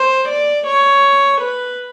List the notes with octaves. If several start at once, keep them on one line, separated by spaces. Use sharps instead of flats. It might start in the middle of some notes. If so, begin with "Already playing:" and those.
Already playing: C5
D5
C#5
B4